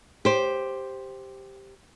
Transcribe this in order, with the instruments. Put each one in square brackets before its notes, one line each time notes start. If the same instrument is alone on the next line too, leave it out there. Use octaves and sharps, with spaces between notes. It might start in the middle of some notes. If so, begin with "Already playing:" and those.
[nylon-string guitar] G4 C5